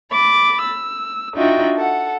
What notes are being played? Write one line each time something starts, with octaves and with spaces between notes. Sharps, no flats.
B5 D6 A6
E6
D4 D#4 F4 F#4 E5 G5
A4 F#5